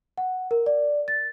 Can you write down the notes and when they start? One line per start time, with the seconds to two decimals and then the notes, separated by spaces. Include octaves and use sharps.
0.18 F#5
0.51 A#4
0.66 D5
1.08 A6